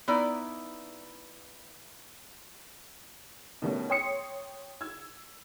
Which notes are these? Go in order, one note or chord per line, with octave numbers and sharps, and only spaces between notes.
B3 D#4 E4 D5
B2 D#3 G3 A3 C#4
C#5 G5 C6 D#6 C7 C#7
E6 G#6